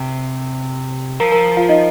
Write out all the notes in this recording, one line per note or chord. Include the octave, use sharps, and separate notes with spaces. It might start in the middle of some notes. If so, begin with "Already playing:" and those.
Already playing: C3
F3 A#4 A#5
A#4 A#5
F4 F5
D#4 D#5